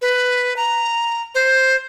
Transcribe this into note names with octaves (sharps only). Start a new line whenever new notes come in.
B4
A#5
C5